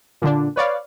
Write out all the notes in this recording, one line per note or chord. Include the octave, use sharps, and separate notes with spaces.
A#2 D3 D4
B4 C#5 D5 F5